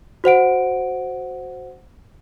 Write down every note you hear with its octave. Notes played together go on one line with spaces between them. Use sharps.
F#4 C5 F#5 D7